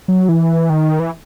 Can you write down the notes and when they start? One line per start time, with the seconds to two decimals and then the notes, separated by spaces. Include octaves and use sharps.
0.08 F#3
0.29 E3
0.70 D#3
1.00 E3